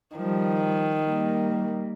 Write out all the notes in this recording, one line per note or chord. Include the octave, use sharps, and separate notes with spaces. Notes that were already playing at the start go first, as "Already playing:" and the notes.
D#3 F3 G3
G3 A#3